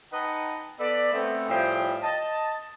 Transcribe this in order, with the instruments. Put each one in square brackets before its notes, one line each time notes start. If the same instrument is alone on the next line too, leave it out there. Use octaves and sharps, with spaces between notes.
[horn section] D#4 B4 D#5 F#5 G5 A5
B3 A4 B4 D5
A3 B3 C4
A2 F3 G3 G#4 G5
D#5 A5